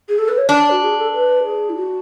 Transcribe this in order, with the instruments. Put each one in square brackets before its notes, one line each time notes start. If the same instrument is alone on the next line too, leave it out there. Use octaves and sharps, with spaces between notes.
[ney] G#4
A4
B4
C#5
[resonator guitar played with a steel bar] D4 [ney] D5
[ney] F#4
G#4
A4
B4
G#4
E4
F#4